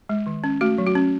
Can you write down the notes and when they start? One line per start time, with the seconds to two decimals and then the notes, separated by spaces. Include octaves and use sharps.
0.09 G#3
0.27 D#3
0.44 C#4
0.61 A3 F#4
0.78 F#3
0.87 F#4
0.95 C#4